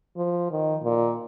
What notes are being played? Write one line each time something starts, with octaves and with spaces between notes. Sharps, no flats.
F3
D#3
A#2